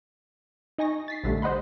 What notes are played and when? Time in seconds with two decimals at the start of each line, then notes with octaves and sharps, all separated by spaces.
0.78 D#4 D#5 G#5 C#6 A#6
1.08 A6 B6 C7
1.24 A#1 D3 G3 A3
1.42 C5 D#5 F#5 B5 C6